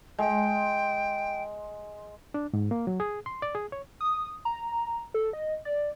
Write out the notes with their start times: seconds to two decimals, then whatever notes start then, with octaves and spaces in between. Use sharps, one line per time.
0.19 G#3 G5
2.34 D4
2.53 G#2
2.71 A#3
2.87 F#3
3.00 G#4
3.26 C6
3.42 D5
3.55 G#4
3.72 C#5
4.00 D#6
4.45 A#5
5.14 A4
5.33 D#5
5.65 D5